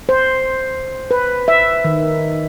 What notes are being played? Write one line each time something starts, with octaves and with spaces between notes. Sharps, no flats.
C5
B4
E5
D#3